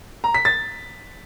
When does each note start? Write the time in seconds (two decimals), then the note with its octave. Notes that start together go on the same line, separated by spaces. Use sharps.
0.24 A#5
0.34 B6
0.45 A6